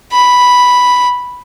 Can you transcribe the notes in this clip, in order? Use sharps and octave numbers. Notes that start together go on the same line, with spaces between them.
B5